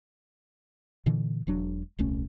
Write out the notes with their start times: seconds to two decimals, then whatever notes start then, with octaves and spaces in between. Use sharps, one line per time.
1.06 A#2 D3 E3
1.47 E1 F#3 D4
1.99 D#1 C2 A3 C#4